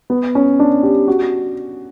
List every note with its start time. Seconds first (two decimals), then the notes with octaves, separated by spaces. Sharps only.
0.10 B3
0.35 C#4
0.59 D4
0.83 G4
1.08 F#4